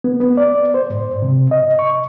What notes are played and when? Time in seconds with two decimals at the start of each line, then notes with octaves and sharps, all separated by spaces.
0.04 B3
0.20 B3
0.37 D5
0.74 C5
0.90 G#2
1.22 C3
1.51 D#5
1.79 C#6